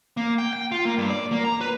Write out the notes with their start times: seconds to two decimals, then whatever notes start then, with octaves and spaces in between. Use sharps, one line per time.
0.17 A#3
0.38 G5
0.53 G5
0.72 F4
0.85 A#3
0.98 G2
1.10 D5
1.32 A#3
1.45 A#5
1.61 B4